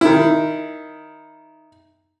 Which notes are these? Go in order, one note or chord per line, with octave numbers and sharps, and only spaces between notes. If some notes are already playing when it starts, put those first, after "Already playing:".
D#3 E4